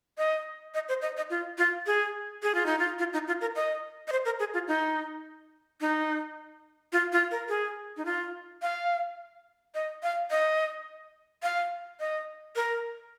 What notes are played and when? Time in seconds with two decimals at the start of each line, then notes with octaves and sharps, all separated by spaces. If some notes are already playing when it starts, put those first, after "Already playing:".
0.18 D#5
0.74 D#5
0.89 C5
1.02 D#5
1.17 D#5
1.30 F4
1.58 F4
1.86 G#4
2.43 G#4
2.55 F4
2.66 D#4
2.79 F4
2.99 F4
3.13 D#4
3.27 F4
3.41 A#4
3.56 D#5
4.08 D#5
4.12 C5
4.25 A#4
4.39 G#4
4.54 F4
4.68 D#4
5.81 D#4
6.93 F4
7.12 F4
7.31 A#4
7.49 G#4
7.97 D#4
8.05 F4
8.62 F5
9.75 D#5
10.03 F5
10.31 D#5
11.43 F5
12.00 D#5
12.56 A#4